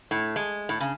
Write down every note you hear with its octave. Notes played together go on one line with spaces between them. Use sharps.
A2
G#3
A2
C#3